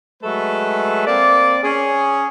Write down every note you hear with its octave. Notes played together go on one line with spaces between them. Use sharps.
F#3 G#3 A3 A4 B4
A#3 C4 D5
C#4 G#4